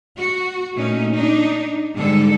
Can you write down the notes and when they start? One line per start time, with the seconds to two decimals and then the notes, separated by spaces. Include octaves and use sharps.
0.16 F#4
0.74 A#2 A3 C#4 D#4
1.15 D4 D#4
1.96 G#2 D3 G3 A4